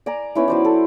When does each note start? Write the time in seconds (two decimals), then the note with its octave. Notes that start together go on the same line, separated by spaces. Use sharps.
0.06 D5 G#5 A#5
0.35 B3 C#4 D#4 E4
0.48 F#3 C5 D5
0.65 A4